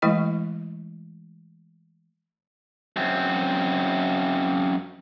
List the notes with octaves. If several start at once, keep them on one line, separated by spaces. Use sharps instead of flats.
E3 G#3 A3 E4 D#5 G5
F#2 C4